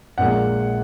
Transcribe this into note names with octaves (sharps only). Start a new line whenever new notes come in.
A#1 A#2 G#3 F#5